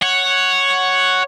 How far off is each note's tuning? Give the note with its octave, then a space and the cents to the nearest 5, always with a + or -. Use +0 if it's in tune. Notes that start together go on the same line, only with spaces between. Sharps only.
C#5 +0 F#5 +0